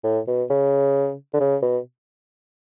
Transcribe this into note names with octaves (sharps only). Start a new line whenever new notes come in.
A2
B2
C#3
D3
C#3
B2